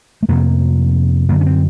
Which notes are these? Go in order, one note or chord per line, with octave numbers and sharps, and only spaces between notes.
A3
F2 C3 A#3
F#2 D3 A#3
C#4
C4